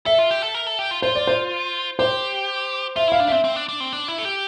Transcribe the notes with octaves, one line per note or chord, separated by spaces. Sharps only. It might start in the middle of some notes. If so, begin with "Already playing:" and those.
A4 E5
F4
G4
A4
A#4
A4
G4
F4
F4 C5
D5
C5
G4 C5
F4 E5
E4 F5
D4
C4 E5
C4
D4
D4
C4
D4
E4
A4
G4